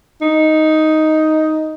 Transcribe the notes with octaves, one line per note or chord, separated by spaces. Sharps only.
D#4